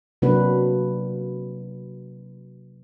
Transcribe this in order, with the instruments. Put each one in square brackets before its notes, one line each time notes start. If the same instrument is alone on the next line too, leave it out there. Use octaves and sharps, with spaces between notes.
[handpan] C3 F#3 A#3 D4 F#4 B4